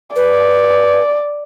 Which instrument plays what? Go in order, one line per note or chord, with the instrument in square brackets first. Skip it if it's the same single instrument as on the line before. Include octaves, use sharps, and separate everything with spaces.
[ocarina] B4 [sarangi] D5